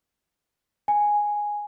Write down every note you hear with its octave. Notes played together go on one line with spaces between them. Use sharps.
G#5